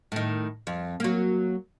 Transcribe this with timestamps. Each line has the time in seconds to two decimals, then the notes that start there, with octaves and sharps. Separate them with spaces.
0.12 A2 D#3
0.67 F2
1.00 F#3 A#3